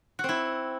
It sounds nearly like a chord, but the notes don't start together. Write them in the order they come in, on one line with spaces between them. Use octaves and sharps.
F#4 C4 E4